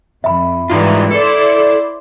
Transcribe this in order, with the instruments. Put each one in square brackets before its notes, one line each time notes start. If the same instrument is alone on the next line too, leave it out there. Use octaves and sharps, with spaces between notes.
[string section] F2 [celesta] E5 B5
[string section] G#2 E3 [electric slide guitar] G3 D#4 F4
[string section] E4 C5 D5 [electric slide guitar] A4